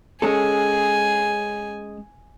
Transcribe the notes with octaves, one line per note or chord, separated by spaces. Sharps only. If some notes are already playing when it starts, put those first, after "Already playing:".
G#3 C#4 A4 G#5